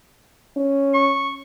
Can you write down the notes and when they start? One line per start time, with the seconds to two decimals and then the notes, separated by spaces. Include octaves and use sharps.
0.57 C#4
0.94 C#6